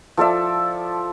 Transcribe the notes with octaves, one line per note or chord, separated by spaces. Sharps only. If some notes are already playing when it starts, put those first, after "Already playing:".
F3 A4 D5 E5